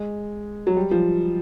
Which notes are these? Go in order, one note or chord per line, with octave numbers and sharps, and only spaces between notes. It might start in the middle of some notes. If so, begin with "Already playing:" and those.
Already playing: G#3
F#3
G3
F3